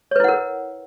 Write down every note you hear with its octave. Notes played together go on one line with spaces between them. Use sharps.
E4 A#4 B4 C#5 F#5